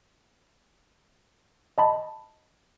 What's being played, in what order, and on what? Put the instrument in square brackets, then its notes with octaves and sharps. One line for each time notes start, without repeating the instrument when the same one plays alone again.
[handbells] D#5 A5 B5